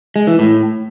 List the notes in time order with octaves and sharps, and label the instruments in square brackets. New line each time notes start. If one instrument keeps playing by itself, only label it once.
[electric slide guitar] G#3
E3
A2